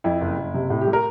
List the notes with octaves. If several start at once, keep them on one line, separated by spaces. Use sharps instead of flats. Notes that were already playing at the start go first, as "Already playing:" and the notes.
F2 E4
F#1
F#1
C3
A2
G4
A3
A#4